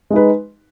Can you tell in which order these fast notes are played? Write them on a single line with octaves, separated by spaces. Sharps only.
G#3 D#4 B4